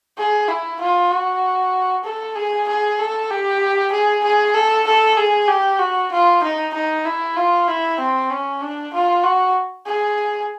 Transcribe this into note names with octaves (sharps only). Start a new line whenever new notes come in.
G#4
E4
F4
F#4
A4
G#4
G#4
A4
G4
G#4
G#4
A4
A4
G#4
G4
F#4
F4
D#4
D#4
E4
F4
E4
C4
C#4
D4
F4
F#4
G#4